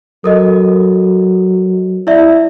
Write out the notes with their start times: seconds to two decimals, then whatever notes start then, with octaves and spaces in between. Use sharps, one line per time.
0.24 F#3 A4 A#4 D#5
2.07 E4 D5 E5